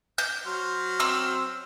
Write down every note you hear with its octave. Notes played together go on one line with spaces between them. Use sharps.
G6
F#3 C5 F6
C4 E6